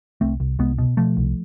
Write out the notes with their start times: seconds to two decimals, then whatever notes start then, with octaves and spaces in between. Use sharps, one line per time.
0.21 C2 A3 C4
0.40 C2
0.59 C2 G#3 B3
0.78 B2
0.97 B2 F3 A3
1.17 C2